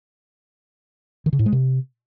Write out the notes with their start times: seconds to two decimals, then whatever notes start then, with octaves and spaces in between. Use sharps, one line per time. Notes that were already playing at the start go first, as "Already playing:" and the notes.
1.26 D#3
1.33 C#3
1.39 A2
1.46 G#3
1.52 C3